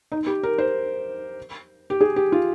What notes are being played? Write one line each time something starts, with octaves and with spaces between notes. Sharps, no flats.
D#4
G4
A#4
C5
G4
G#4
G4
F4